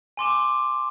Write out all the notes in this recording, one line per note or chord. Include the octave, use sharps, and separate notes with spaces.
G#5 C6 D6 E7